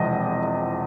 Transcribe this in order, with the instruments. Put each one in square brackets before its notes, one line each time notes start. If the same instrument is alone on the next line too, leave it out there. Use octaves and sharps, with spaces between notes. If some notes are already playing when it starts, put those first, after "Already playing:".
Already playing: [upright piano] E1 E2 C3 F3 D#5